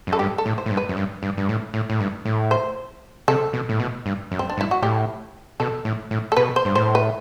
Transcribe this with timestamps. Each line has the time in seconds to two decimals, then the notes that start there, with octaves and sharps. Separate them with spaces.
0.07 F#2
0.13 A4
0.19 G2 G4
0.38 A4
0.46 A2
0.58 C5
0.66 A2
0.71 G2
0.77 B4
0.89 F#2
0.97 G2
1.23 G2
1.37 G2
1.49 A2
1.74 A2
1.90 A2
2.00 G2
2.25 A2
2.51 C5
3.28 C3 A4
3.53 B2
3.69 A2
3.80 B2
4.06 G2
4.32 F#2
4.39 C4
4.50 D4
4.57 G2
4.61 E4
4.71 F#4
4.82 A2 G4
5.60 B2 A4
5.85 A2
6.11 A2
6.32 A4
6.37 B2 B4
6.56 C5
6.65 G2
6.75 A2 C5
6.95 B4